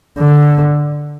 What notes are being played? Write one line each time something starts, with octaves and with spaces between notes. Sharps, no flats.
D3